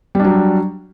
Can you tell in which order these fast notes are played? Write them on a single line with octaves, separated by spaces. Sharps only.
G3 D4 F#3